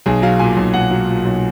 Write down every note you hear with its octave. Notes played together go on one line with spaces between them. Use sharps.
B1 G#4
F#3 F5
A#2 G#5
B1
B1 F#5
F#3
A#2
B1